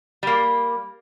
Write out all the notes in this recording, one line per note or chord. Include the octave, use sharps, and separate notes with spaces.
G3 A#3